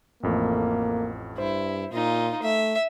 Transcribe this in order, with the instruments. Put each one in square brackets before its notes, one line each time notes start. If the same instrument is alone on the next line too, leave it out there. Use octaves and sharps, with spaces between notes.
[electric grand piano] A1 F2 A3 [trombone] A#3
[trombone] G2 [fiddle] E4 [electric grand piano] C5
[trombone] A#2 [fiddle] D#4 F4
[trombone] A3 [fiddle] E5